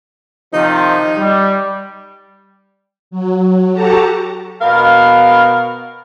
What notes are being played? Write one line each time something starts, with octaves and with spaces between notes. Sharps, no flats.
C3 D#3 F3 D#4
G3
F#3
F#4 G4 A4 A5 A#5
B2 B3 A#4 F5